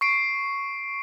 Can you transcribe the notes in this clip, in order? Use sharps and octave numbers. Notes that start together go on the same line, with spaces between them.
C#6 C7 D7